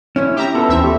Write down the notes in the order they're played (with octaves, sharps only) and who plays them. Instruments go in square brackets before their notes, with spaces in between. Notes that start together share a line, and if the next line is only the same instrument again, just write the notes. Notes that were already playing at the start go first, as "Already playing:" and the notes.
[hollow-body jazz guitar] C#4 E4 C#5
[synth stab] G4 E5 A#5
[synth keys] B3 F4 B4 [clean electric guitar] A4
[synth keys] D#2 E4 [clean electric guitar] E3 [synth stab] C4 E5
[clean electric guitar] A3 [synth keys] G4 D5